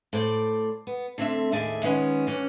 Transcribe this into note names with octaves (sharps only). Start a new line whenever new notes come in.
A2 C5 D5
B3
D3 A3 C4 D4 E5
D#2 A2 G#4 D5 E5
D#3 G#3 B3 C#4
E3 C#4 D4